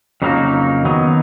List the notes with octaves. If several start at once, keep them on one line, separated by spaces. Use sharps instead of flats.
F2 C#3 F#3 A#3 D#4
D#3 F#3 B3 D#4